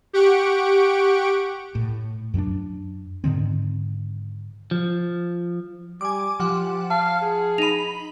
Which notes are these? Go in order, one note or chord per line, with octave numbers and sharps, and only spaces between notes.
G4 F#5 C#6 D7
A2
F#2 F#3 B3 D4
G#2 D3 D#3 C4
F3
G3 G#5 D6
F3 G4 F#5
F5 A5
G#4
D#4 B5 D#7 F7